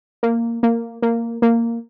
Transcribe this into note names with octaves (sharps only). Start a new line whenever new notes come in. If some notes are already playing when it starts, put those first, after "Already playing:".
A#3
A#3
A#3
A#3